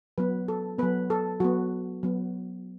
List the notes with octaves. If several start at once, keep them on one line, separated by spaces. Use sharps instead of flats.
F#3 B3 B4
A4
F#3 B3 B4
A4
F#3 B3 F#4
F#3 B3